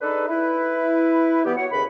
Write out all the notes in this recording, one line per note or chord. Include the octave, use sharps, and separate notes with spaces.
D4 D#4 G#4 A4 B4
E4 B4
E3 G3 B3 G4
F#4 C#5 F#5
D#2 C#3 B4 B5